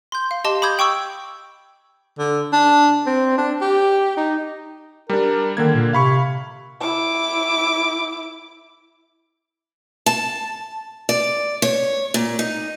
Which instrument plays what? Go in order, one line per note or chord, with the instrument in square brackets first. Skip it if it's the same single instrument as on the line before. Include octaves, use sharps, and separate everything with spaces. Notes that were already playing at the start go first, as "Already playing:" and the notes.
[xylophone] C6 G6
F5
G4 D#5 A5 C6 D6 G7
B5 D6 D#6 G6 G#6
G5 C#6 D6 E6
[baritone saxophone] D3
D4
C4
D4
G4
D#4
[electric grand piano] G3 D4 [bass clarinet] A#4
[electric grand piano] D3 A#3 G#6 [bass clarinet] D#3
[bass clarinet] A#2
[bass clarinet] C3 [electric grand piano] F5 B5 C#6
[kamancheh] E4 D6
[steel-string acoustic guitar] A5
D5
C#5
A#2
D#4